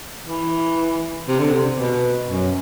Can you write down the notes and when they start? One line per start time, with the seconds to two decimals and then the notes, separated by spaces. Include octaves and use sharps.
0.25 E3
1.28 C3
1.39 D3
1.51 C3
1.79 B2
2.29 F#2